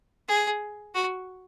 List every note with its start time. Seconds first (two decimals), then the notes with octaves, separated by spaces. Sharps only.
0.28 G#4
0.95 F#4